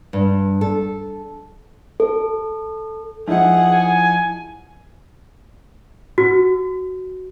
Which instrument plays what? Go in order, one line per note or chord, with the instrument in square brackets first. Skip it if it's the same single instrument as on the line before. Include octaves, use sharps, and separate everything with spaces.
[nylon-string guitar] G2
A4
[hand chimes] A4
[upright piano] F3 D#4 E4 [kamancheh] G#4 F#5
[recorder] G#5
[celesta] F#4